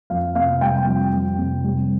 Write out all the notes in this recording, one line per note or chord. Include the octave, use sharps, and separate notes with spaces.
F2 F5
C3 F5
G3 G5
F2
F2
C3
G3